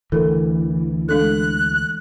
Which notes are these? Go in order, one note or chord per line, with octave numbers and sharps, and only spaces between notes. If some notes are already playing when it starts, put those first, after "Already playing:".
D2 E3 A4 A#4
G#3 D4 A4 F#6